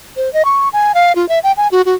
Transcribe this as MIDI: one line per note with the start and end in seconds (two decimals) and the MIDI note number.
0.17 0.32 72
0.33 0.45 75
0.45 0.69 85
0.73 0.92 80
0.95 1.15 77
1.15 1.28 65
1.29 1.39 76
1.43 1.52 79
1.57 1.68 80
1.72 1.82 66
1.86 1.95 66